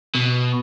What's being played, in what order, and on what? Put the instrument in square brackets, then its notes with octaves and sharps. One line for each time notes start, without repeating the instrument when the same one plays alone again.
[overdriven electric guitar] B2